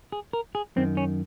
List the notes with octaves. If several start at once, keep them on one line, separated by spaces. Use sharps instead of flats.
G#4
A#4
G#4
F#2 D#3 C4
C#4